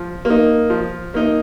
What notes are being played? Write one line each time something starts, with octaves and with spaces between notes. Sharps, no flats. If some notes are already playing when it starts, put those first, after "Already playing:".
Already playing: F3
A#3
D#4
F3
A#3 D#4